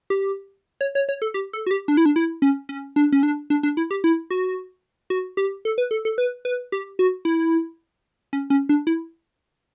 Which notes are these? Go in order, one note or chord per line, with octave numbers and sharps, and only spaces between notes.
G4
C#5
C#5
C#5
A4
G4
A4
F#4
G4
D4
E4
D4
E4
C#4
C#4
D4
C#4
D4
D4
D4
E4
G4
E4
F#4
F#4
G4
A4
B4
A4
A4
B4
B4
G4
F#4
E4
C#4
C#4
D4
E4